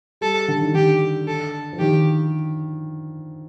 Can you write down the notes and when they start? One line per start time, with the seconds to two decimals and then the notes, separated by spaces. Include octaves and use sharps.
0.21 G3 A4
0.48 D3
0.61 D#3
0.74 D3 G4
1.27 A4
1.73 F3
1.79 D#3 G4